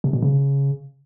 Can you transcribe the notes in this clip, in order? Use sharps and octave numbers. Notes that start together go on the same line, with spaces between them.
C3
B2
C#3